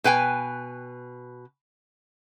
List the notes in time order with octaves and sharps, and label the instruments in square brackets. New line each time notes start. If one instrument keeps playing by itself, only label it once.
[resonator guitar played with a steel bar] B2 B4 G5 G#5